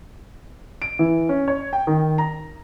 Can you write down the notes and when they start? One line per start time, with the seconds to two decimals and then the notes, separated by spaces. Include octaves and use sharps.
0.82 D7
0.99 E3
1.29 C#4
1.48 C#5
1.73 G5
1.87 D#3
2.18 A#5